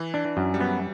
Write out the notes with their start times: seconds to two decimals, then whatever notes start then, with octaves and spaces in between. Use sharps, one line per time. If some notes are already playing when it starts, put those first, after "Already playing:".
Already playing: E3
0.14 D4
0.25 E3
0.37 F#2
0.54 G3
0.59 F#3 B3